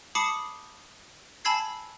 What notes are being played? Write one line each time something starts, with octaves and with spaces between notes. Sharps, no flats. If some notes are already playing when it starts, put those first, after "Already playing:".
A5 B5 D6 D#6 C7 C#7
G#5 A5 B5 E6 G#6 C7